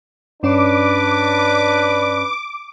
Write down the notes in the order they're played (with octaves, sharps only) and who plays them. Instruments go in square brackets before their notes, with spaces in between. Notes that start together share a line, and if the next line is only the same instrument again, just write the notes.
[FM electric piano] G2 C#4 C#5 [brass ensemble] D4 B4 [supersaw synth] D6